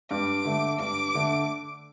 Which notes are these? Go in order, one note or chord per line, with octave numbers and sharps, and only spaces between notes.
G2 D6
D3 A3
G2 D6
D3 A3